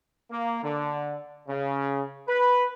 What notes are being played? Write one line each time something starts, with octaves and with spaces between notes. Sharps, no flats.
A#3
D3
C#3
B4